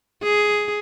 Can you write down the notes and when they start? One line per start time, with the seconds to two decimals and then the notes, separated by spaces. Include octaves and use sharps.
0.23 G#4